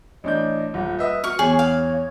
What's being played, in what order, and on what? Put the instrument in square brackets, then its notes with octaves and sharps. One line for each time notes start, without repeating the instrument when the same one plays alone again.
[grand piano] A1 D4 G6 [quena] D#5
[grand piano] D#1 [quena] F#5
[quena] B4 [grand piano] D#5 E5 D#6
[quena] F#4 [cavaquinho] C#6 [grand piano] F6
[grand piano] E2 C#6 [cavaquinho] G#4 [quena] C#5
[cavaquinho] F5